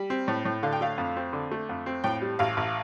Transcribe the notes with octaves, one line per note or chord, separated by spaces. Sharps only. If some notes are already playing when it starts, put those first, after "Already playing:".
Already playing: G3
C4
A2
A2
D3 F5
G5
A3 F5
F2
C4
D3
A3
F2
C4
A2 G5
G3
A1 F5
A1